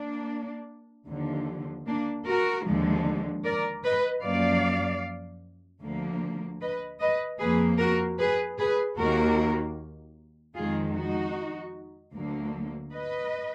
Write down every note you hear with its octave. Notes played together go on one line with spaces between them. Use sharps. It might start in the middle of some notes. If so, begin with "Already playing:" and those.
Already playing: A#3 D4
D#2 D3 F3
A#3 D4
F#4 A#4
D#2 D3 F3 G#3
A#4 D5
B4 D#5
F#2 F3 A#3 D5 F5
D2 D3 F3 A#3
B4 D#5
B4 D#5
F2 F3 A#3 G#4 B4
F#4 A#4
G#4 B4
G#4 B4
D#2 D#3 A#3 F#4 A#4
F2 D#3 G#3 F4 G#4
D#4 F#4
D2 D3 F#3 A#3
B4 D#5